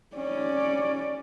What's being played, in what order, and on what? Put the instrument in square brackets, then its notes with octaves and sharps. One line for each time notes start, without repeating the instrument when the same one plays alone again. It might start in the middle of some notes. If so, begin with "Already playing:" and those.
[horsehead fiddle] C#4 D5